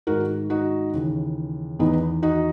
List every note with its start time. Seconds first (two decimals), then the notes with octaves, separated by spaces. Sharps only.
0.07 G#2 D#3 F#4 A#4
0.50 D#4 F#4
0.93 D#2 C#3 E3
1.79 E2 D#3 B3 D#4
2.22 D#4 F#4